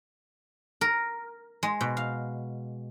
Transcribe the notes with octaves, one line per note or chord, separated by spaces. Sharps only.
A#4
G#3
B2
F5